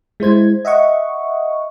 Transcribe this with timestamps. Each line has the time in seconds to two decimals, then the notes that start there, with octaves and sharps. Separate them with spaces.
0.20 G#3 E4 C5 G#6
0.65 D#5 E5 F#5 C#6